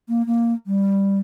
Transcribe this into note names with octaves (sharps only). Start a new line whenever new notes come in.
A#3
A#3
G3